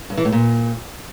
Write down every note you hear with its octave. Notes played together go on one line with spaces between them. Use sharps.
G2
E3
A2
A#2